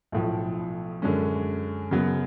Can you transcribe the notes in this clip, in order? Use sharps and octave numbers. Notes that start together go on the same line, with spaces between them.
B1 A2 F3
F#2 D3 G#3 C#4
F#2 C#3 F#3 B3